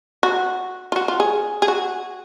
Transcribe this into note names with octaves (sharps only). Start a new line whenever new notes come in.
F#4
F4
F#4
F4
G#4
G#4
F#4